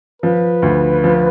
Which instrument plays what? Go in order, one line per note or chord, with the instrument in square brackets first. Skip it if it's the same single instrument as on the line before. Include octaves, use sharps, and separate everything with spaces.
[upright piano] F3 [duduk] B4
[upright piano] D2
F3